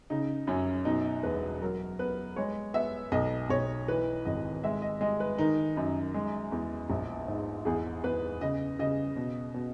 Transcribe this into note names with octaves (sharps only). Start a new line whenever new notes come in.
C#3 D#4
F#2 C#4
B2 D#4
E1 B4
F#3 A#4
B3 B4
G#3 C#5
B3 E5
B1 D#5
B1 C#5
E3 B4
G#1 D#5
G#3 E5
D#5
G#3 D#5
B4
D#3 D#4
F#2 D#4
G#3
E2
A#1
G#2
E2 G#4
E2 B4
C#3 D#5
C#3 D#5
B2
B2